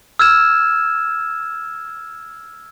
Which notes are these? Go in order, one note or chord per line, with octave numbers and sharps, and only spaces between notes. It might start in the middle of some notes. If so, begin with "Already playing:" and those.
E6 F6 G#6 E7